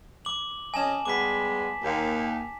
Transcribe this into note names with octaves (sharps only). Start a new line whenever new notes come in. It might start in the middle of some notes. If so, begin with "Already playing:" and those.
D6 F#7
F2 C#4 D#5 G#5 A5 E7
G3 G#3 B3 D6 B6
D#2